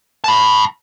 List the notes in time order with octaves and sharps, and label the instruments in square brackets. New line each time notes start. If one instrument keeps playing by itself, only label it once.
[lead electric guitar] A5 B5